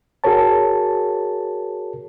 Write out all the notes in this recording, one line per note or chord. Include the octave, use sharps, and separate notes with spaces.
F#4 G#4 A#4 C#5 A5